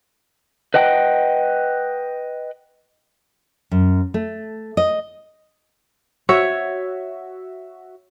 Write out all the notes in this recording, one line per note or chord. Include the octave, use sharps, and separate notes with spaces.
B4 D#5 F#5 G5
F#2
A3
D#5
F#4 C#5 E5